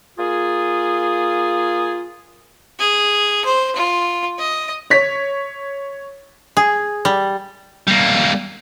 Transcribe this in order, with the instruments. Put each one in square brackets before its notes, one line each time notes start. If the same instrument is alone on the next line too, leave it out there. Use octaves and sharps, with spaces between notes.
[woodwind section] A#3 F4 G#4
[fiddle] G#4
C5
F4
D#5
[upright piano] C#5 B6
[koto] G#4
G3
[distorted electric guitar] G3 A#3